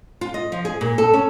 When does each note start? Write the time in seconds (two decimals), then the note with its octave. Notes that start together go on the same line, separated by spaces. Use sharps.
0.21 F4
0.34 D#5
0.52 F3
0.65 G#4
0.81 A#2
0.98 A4
1.13 C#4